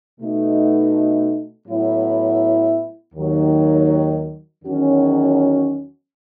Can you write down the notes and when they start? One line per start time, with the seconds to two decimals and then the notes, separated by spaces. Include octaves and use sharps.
0.20 B2 A3 D#4
1.68 A2 F#3 B3 E4
3.15 D#2 D#3 F#3
4.63 E2 D#3 F#3 C#4 F#4